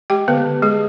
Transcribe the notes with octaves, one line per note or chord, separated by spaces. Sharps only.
G#3 G4 G5
D3 B3 B4
D3
G#3 G#4